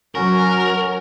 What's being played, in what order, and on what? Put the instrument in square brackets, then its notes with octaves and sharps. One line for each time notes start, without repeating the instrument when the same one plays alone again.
[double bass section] F#3 [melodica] C#4 F#4 [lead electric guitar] A#4